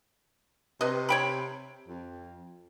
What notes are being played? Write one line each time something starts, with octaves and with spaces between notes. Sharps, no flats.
C3 B4 D#5
C#5 G5 B5
F2